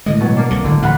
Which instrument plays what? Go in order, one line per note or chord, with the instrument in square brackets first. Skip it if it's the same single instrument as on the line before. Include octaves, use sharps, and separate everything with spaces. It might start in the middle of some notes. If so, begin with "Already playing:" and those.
[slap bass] A2 D3 G#3 [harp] D#5
[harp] B2 F#3
A#3 D4
[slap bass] C2 D3
[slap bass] G#1 A2 [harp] D3
[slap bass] A1 D2 G#2 [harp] F5 F#5 B5